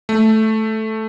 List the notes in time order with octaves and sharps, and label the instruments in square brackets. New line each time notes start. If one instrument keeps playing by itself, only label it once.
[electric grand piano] A3